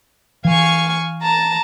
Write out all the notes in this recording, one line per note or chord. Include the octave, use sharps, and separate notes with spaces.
E3 F5 G#5 C#6
A5 A#5